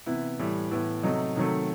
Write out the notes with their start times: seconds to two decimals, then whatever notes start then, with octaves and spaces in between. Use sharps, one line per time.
0.06 C3 E3 B3 E4
0.39 A2 E3 G3
0.71 A2 E3 B3
1.03 C3 F#3 A3 D#4
1.35 C3 D#3 F#3 A3